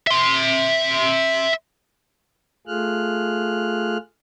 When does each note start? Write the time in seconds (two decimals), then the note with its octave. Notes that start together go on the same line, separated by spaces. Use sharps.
0.07 E5 C6
2.67 A3 F4 G#4 F6 F#6